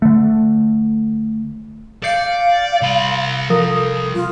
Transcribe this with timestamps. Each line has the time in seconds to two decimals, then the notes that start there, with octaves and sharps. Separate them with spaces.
0.02 D3 A3
2.04 D5 F5 G6 C7 C#7
2.81 C2 B5
3.50 F3 A4 A#4 D#6
4.13 F4